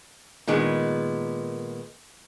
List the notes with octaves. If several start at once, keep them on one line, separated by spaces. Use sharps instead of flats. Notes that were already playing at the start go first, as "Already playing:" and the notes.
A#2 D#3 G#3 B3